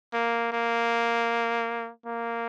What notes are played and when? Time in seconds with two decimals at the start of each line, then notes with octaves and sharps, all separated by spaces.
0.14 A#3
0.52 A#3
2.06 A#3